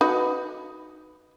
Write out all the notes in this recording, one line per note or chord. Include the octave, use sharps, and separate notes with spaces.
D#4 F#4 B4